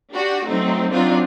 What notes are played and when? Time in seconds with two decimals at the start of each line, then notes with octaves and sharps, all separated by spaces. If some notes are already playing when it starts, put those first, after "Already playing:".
0.14 D4 F#4 G4
0.47 F#3 A3 C4 D#4
0.91 F#3 C4 D4 D#4 F4